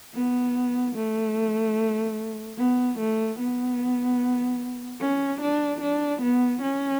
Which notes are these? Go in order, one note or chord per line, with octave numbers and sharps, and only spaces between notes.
B3
A3
B3
A3
B3
C#4
D4
D4
B3
C#4